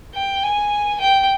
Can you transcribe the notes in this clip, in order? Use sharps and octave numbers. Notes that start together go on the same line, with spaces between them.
G5
G#5
G5